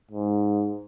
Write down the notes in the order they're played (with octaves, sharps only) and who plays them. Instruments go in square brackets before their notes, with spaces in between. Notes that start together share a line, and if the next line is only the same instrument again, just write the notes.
[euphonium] G#2